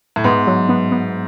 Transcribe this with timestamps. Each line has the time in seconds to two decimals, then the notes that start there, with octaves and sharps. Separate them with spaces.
0.16 A2
0.24 G#2 B3
0.47 F#3
0.69 B3
0.91 B3